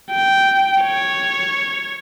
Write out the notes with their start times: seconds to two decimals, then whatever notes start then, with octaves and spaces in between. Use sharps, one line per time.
0.11 G5
0.82 C#5